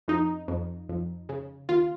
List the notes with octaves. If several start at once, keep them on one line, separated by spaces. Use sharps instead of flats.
F2 D#4
F2
F2
C#3
D#2 F4